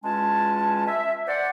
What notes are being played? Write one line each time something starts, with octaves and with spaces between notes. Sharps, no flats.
E2 G#3 C#4 F4 G#5 A5
E5
C5 D5 F#5